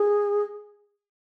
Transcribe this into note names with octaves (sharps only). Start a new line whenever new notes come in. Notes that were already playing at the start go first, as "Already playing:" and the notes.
Already playing: G#4